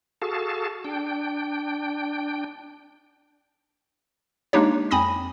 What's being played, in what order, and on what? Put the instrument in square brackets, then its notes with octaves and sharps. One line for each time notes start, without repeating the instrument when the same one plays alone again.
[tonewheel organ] F#4 G#4 A4 F5 A5
D4 G5
[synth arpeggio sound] G#3 A#3 D4 D#4 G4 C#5
F2 C4 G#5 B5 D#6 A#6